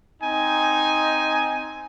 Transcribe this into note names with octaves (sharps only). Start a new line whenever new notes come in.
C4 D#4 G#5